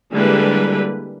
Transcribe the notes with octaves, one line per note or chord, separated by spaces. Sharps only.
D3 G3 G#3 A#3 E4 B4